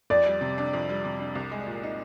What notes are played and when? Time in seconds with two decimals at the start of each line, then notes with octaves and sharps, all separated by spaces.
0.10 F2 D5
0.26 G3
0.41 C3
0.58 D4
0.73 F2
0.89 G3
1.05 C3
1.20 D4
1.35 C2
1.51 G#3
1.67 A#2
1.83 D#4